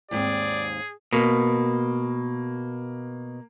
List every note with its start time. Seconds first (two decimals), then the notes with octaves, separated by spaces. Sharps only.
0.11 D#2 G#2 C4 G#4 D5
1.13 B2 A#3